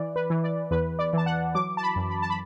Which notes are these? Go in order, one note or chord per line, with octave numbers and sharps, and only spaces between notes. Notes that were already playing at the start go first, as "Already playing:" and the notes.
Already playing: E3 D5
B4
E3
D5
E2 B4
D5
E3 A5
F#5
F#3 D6
A5
B5
F#2
B5
A5
B5